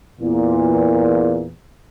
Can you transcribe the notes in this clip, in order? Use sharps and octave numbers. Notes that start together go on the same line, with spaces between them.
E2 A#2